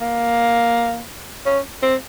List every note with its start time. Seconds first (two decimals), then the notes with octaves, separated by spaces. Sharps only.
0.01 A#3
1.46 C#4
1.82 C4